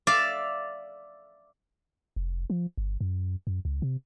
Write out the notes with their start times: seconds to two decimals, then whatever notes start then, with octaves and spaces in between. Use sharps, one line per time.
0.07 D5 E5 F5
2.16 F1
2.50 F3
2.78 G1
3.01 F#2
3.47 F#2
3.65 C#2
3.82 C3